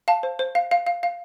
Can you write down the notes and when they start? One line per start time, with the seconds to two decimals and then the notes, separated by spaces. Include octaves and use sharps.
0.08 F5 A5
0.23 C5
0.39 C5
0.55 F5
0.71 F5
0.87 F5
1.03 F5